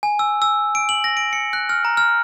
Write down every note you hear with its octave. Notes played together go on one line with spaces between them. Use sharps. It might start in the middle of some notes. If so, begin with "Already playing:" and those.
G#5
E6
E6
D7
F#7
A#6
D7
C#7
F#6
F6
A#5
F6